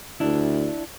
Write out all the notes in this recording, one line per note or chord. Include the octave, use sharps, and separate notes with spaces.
D2 D4 E4